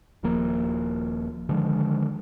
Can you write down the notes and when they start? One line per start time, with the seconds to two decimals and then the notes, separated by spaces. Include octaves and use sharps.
0.23 D#1 D#3 F3 A#3
1.49 D3 D#3 F3 G#3